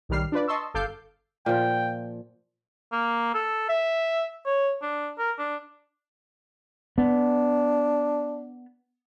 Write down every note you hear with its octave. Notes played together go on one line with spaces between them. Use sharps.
B1 A2 D#3 G3 F6 C7
D4 F4 B4 D5
D#5 A5 C6 C#6 E6
G1 A4 F5 D6 G6 C7
A#2 F3 G5
A#3
A4
E5
C#5
D4
A#4
D4
B3 D4